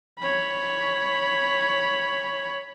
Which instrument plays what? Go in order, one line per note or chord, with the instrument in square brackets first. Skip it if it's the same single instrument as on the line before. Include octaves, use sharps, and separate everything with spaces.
[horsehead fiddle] C#5 B5